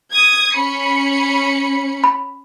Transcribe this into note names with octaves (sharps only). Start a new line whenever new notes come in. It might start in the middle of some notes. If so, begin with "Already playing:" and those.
D#6 G#6
C#4 B5 C#7
B5